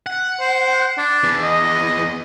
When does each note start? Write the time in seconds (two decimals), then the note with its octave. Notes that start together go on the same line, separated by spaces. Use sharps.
0.06 F#5
0.40 C5
0.98 D4
1.24 E2 E3
1.43 D#5